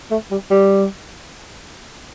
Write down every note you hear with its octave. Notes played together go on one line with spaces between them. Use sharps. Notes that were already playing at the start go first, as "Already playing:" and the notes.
A3
G3
G3